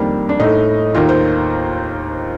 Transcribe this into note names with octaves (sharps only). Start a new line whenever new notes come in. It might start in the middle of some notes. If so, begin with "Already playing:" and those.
Already playing: F2 D#3 G3 A#3 D4
D4
A2 A3 D#4
D#2 D#3 A#3 F4
C5